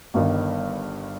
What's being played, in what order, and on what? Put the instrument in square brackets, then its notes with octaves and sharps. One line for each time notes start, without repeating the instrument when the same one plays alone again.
[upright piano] G1 G2 D#3